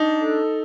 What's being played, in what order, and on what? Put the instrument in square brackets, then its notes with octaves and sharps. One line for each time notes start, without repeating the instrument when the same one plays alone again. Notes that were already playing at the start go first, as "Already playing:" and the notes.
Already playing: [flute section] D4 [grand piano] D#4
[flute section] A4